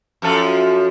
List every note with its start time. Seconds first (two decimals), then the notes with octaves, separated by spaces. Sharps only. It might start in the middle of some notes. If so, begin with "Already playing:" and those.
0.22 F#2 F3 A4